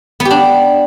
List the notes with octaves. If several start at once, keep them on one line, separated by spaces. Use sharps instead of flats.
B3
G4
D4